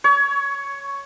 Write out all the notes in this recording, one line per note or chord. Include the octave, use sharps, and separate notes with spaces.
C#5